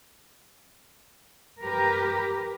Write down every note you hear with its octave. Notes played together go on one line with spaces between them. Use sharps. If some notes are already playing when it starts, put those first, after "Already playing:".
G4 A#4 B4